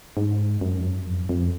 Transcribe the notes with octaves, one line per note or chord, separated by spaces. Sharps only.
G#2
F#2
F2
F#2
F2
F2